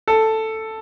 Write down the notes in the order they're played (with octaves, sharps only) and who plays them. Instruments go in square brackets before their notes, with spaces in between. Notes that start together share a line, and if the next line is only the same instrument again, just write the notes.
[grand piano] A4